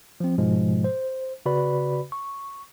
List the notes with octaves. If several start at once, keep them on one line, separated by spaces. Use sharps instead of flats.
F3 C4
G#2 B2 F3 G#3
C5
C#3 F#4 B4 D5 B5
C#6